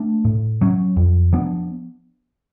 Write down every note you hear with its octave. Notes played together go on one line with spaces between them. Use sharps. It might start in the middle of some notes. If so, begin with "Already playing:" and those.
Already playing: A3 D4
A2
F#3 C#4
F2
F3 B3 D4